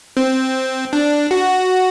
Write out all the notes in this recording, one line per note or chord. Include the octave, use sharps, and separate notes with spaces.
C4
D4
F#4